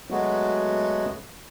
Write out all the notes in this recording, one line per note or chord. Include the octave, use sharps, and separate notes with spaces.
F#3 G#3 A3 B3 F#4